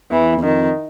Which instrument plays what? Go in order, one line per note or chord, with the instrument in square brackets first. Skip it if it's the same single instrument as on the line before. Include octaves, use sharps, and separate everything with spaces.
[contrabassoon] E2 [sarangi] E3
[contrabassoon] E2
[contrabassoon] F2 [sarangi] D#3